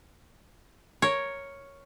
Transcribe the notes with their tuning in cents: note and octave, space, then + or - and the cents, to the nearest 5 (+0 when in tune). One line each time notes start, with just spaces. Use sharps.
A#4 +0 C#5 +0